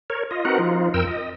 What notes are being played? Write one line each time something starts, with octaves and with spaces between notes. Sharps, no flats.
A#4 C#5
F4 D#5
C4 D#4 F#4 A#4 B4 F#5
F3 D#4 F4
F2 A#4 G5 E6
D#5